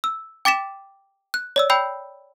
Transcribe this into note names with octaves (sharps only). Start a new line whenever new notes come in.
E6
G5 D6 A6 B6 E7
F#6
C#5 D5 E6
G5 B5 E6 G6 C7